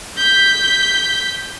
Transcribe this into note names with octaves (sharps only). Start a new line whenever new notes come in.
G6 B6